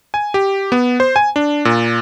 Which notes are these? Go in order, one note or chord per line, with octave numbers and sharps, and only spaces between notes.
G#5
G4
B3
C5
G#5
D4
A#2